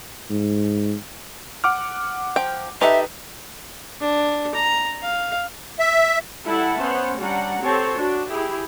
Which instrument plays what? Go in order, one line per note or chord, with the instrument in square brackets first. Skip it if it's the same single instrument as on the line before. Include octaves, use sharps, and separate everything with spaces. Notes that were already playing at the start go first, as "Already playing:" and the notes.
[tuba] G#2
[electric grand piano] F#5 D6 F6
[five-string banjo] F3 G5
[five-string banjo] D#4 G4 A4 [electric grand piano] B4 [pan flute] E5
[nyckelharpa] D4
A#5
F5
[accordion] E5
[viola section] G3 E4 A4 E5 F#5 A5
B3 C#4 C5 F#5
G3 C#4 D4 F#5 A#5
C4 G4 A4 C5 C#5 A5
D4 F#4
E4 G4 G#4